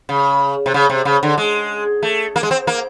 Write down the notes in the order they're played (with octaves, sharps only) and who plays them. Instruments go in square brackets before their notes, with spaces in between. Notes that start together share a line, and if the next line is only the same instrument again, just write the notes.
[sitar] C#3
C3
C#3
C3
C#3
D3
G#3
A3
A#3
G#3
C4
A#3